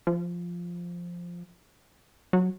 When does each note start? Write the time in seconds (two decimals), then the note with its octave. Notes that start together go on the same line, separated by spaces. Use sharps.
0.07 F3
2.33 F#3